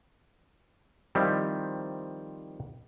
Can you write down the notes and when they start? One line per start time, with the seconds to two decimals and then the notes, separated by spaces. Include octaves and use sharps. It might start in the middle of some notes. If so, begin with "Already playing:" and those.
1.15 D#3 F3 G3 C4 D#4 E4